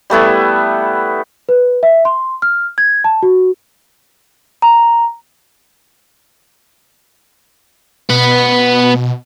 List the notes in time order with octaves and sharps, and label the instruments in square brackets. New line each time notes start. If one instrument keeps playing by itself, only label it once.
[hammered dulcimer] G3 A3 B3 E4
[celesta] B4
E5
C6
F6
G#6
A5
F#4
A#5
[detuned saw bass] B2 [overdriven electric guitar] B3